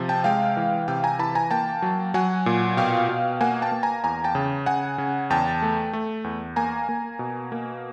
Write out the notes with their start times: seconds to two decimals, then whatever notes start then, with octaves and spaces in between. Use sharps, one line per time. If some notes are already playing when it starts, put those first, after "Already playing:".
Already playing: C3 F3
0.09 G5 A5
0.24 G#3 F5 G5
0.57 E3
0.88 C3 F5 G5
1.04 G#5 A#5
1.19 E3 A5 B5
1.35 G#5 A#5
1.51 A#3 G5 A5
1.82 F#3
2.14 F#3 F#5 G#5
2.46 A#2
2.77 B2 F5 G5
3.08 B2
3.41 A#3 F#5 G#5
3.62 G5 A5
3.72 A#3
3.83 G#5 A#5
4.04 E2 G#5 A#5
4.24 G5 A5
4.35 C#3
4.66 C#3 F#5 G#5
4.98 C#3
5.30 E2 G5 A5
5.62 A3
5.93 A3
6.24 E2
6.56 A#3 G#5 A#5
6.89 A#3
7.19 B2
7.52 A#3